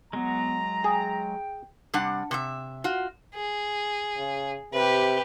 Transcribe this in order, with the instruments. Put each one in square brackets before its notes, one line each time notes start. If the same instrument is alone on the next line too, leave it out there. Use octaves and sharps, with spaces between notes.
[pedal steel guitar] F#3 G#3 [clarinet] B3 [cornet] A#5
[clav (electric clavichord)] G#4 [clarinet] G5
[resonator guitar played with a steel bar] C3 G3 D4 F#5
C3 C5 E5
F4 F#4
[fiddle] G#4
[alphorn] C#3
[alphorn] C3 [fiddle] G4 B4